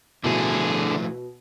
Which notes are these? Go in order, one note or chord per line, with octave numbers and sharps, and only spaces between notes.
B2 D3 F3 A3 E4 G#4